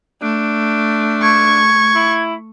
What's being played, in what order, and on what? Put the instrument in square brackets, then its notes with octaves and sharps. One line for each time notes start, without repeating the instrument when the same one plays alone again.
[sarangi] A3 [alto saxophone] D4
[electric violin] C#6 [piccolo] G#6
[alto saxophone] E4